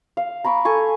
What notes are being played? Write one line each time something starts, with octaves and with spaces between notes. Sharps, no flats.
F5
A#5 B5 C#6 D6
A4 G#5 C#6